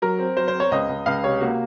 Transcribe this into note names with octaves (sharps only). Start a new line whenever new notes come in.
F#3 A#4
C4
F#3 C5
C5
C4
C#5
C#2 D#5
C#2
C#2 F5
C3 C#5
A#3 F#4